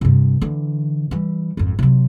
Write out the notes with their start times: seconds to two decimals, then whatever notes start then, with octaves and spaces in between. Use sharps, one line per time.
0.01 G2 C3
0.41 D3 E3
1.11 E3 G3
1.57 G#1 F2
1.79 C3 F#3